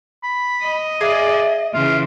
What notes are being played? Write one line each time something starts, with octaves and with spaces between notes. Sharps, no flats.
B5
D#5
G#4 D5 E5 F5 G#5
C#3 E3 F4